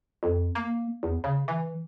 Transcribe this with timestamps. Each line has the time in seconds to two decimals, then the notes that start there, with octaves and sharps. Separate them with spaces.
0.23 F2
0.55 A#3
1.03 E2
1.24 C#3
1.48 E3